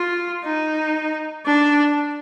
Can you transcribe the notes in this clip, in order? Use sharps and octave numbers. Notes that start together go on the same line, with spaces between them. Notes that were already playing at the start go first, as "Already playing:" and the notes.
Already playing: F4
D#4
D4